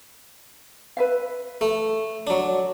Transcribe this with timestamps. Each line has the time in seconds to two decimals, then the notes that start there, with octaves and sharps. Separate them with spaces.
0.97 B4 E5 F5
1.61 A3
2.27 F#3 D4